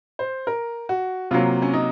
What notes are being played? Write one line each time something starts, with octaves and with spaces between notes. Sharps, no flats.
C5
A#4
F#4
C3 F#3 A#3 F4
C#4
D#4